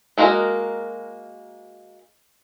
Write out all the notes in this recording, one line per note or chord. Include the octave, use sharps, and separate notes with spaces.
G#3 A#3 F#4 A#4 D#5